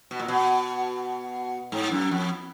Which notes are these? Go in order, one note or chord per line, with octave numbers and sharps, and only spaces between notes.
B2
A#2
B2
G#2
F#2
F2